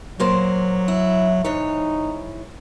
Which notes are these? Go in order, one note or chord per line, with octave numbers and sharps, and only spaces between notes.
A#2 F#3 A#3 C5
E4
G#2 E3 D#4 C#5